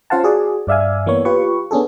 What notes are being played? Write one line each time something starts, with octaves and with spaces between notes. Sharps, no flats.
C#4 F4 C5 F5 F#5 A5
F#4 G#4 D5
G2 D5 E5 F5 G#5
E3 A#3 B3 C#5
F4 G4 B4 C#6
B3 C#4 D4 G#4 A4